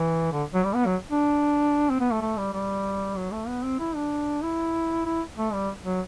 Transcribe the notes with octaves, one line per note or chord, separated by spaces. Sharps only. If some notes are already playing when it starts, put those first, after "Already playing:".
Already playing: E3
D3
F#3
G3
B3
F#3
D4
C4
B3
A3
A3
G3
G3
F#3
A3
B3
C4
E4
D4
E4
E4
A3
G3
F#3